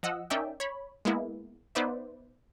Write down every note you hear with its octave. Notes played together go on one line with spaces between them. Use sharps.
F3 D#5 F#5 E6
C#4 D#4 A#4 D5 E5 G5
C#5 B5
G#3 A#3 B3 E4
B3 D#4 B4 C5 D5 E5